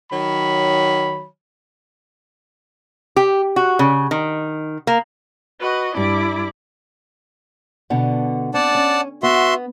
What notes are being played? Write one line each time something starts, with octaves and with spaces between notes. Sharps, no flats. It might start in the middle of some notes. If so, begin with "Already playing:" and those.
D#3 F#3 C#5 B5
G4
F#4
C#3
D#3
A#3
F#4 B4 D#5
G2 E4 D5 D6
B2 D3 F#5
C4 D5 F#5 A5
C#4
B3 F#4 E5 C6